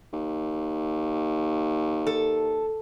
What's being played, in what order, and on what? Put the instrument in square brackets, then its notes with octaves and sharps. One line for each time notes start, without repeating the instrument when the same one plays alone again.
[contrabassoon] D#2
[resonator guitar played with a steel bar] A4